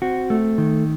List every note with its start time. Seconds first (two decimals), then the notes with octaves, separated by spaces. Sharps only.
0.02 C4 F#4
0.30 A3
0.58 D#3